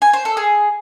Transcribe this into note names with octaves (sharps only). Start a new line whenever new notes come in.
G#5
C5
A4
G#4